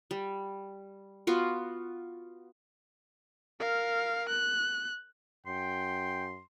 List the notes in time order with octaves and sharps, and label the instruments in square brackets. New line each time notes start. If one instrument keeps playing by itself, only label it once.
[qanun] G3
B3 F4 F#4
[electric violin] A#4 F5
F#6
[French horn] F#2 [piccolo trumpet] G5 [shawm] C6